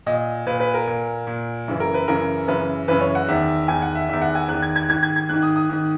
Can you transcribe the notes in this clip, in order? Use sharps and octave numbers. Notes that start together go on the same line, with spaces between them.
A#2 D#5
A#2 B4
B4
A#4
A#2
A#2
F#2 C#3 E3
A#4
B4
F#2 C#3 E3 A#4
F#2 C#3 E3 B4
F#2 C#3 E3 B4
C#5
F#5
E2 D#3 E5
E2 D#3 G#5
F#5
E5
E2 D#3 E5
F#5
G#5
E2 D#3 F#6
G#6
G#6
G#2 D#3 G#6
G#6
G#6
G#2 D#3 F#6
D#6
D#6
G#2 D#3